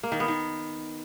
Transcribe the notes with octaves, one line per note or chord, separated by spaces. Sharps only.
A#3
D#3
B3
D#3